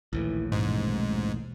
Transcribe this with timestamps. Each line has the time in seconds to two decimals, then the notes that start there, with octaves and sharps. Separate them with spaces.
0.13 A#1 D#2 A2 E3
0.52 A1 G#2 B2 E3